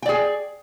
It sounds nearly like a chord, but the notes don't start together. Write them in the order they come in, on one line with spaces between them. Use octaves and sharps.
G5 D5 G#4